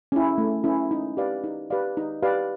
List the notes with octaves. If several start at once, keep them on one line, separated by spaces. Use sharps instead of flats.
C#4 E4
A3
C#4 E4
D#4
G4 B4 D5 F5
D#4
G4 B4 D5 F5
D#4
G4 B4 D5 F5